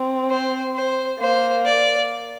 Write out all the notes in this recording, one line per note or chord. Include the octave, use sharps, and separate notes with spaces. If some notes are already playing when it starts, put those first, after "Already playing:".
Already playing: C4
C5
C5
A#3 C5
D5